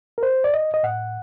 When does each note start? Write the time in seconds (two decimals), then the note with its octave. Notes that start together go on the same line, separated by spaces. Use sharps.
0.18 A#4
0.23 C5
0.44 D5
0.54 D#5
0.74 D#5
0.83 A2 F#5